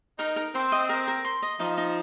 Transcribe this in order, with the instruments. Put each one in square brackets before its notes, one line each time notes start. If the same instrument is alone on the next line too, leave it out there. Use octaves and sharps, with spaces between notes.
[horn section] D#4 [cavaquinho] A#4
[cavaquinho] A#4
[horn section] C4 [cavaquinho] C6
[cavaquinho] D#5
A#4
A#4
C6
D#5
[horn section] F3 [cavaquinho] D#4
[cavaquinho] D#4